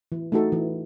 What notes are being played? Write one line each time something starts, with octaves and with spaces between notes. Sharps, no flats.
E3
A3 D#4 F#4 A4
E3